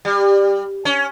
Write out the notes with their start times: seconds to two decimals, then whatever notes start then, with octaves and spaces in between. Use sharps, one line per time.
0.05 G3
0.85 C#4